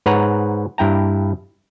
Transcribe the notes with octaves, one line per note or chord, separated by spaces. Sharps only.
G#2 B4 C#5 F#5 A#5
G2 E4 G5 A#5